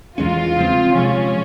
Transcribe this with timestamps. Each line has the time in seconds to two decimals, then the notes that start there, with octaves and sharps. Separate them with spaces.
0.18 E2 E3 G#3 C#4 F4
0.56 C#3 F3 C4
0.94 C3 F3 G#3 C#4